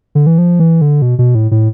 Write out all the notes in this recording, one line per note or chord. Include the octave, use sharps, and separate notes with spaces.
D3
E3
F3
E3
D3
B2
B2
A2
A2